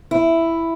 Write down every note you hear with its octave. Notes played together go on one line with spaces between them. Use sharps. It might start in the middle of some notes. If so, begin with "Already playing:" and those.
E4